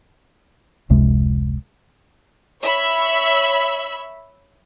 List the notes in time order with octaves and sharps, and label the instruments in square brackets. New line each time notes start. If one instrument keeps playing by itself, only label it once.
[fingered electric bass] F1 C#2 C3 G#3
[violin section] C#5 E5 B5